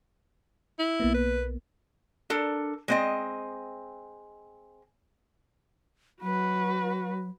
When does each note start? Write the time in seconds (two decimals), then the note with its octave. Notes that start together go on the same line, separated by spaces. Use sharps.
0.79 E4
1.00 B1 A#3 B3
1.15 B4
2.30 D4 A4 A#4
2.88 G#3 C4 D#5
6.22 F#3 F#4 B4